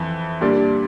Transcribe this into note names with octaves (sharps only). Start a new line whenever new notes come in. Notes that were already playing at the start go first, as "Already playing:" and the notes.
Already playing: F2 E3
A#2 G3 D4 G4 D5